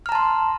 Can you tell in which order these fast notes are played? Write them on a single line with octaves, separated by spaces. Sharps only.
F6 A#5 A5 C6